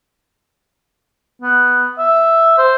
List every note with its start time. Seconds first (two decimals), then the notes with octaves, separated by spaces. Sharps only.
1.42 B3
1.98 E5
2.58 C5